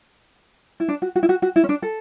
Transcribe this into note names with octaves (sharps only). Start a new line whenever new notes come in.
E4
D4
F#4
F#4
E4
F#4
F#4
E4
C#4
D4
A4